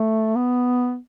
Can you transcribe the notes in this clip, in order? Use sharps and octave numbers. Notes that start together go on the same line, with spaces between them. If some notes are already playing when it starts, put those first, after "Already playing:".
Already playing: A3
B3